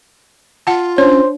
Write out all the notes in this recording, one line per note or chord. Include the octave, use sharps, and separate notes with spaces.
F4 F#5 A5
C#4 D4 C5 C#5